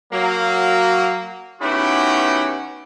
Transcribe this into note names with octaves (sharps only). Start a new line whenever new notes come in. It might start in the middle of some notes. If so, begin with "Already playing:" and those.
F#3 A#3
D#3 B3 C#4 E4 F#4 G4